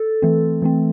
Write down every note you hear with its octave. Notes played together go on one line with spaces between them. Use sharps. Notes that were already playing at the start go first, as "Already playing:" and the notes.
Already playing: A4
E3 A3 C4
E3 A3 C4